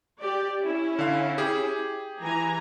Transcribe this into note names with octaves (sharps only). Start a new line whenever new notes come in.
G4 D5
C#4 E4
D3 F5
G4 G#4
E3 G#5 A#5